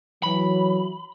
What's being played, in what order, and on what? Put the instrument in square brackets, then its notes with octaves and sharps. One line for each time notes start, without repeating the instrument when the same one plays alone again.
[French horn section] E3 F#3 [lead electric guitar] B5